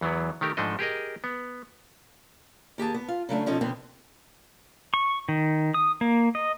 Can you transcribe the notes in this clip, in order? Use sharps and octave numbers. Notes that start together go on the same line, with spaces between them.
E2 E3 F#3 B3
D#3 A3 G4 A#4
G#2 F3 A3 D4 A4 D#5
G4 G#4 A#4 D#5
B3
D#2 G4 G#4 A5
B3
F4
C#3 F#3 A3 D4
B2 F3 C#4 D#4 A4
F2 B2 D3 B3 C4
C#6
D#3
D#6
A#3
D#5